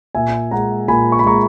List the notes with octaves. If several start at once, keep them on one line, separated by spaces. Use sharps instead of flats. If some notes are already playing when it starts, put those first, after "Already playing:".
A#2 E5 G#5
G#3 F#5 A#5
A#2 G#5 B5
C#6
B5
G#3 A#5 C#6